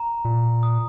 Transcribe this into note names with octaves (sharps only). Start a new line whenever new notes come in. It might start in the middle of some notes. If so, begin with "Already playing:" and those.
Already playing: A#5
A#2
D#6